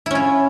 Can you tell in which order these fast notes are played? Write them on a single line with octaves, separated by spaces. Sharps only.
E4 C#4 F4